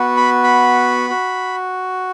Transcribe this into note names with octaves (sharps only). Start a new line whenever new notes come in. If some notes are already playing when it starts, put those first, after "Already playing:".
Already playing: B3 F#4
B5
B5
F#4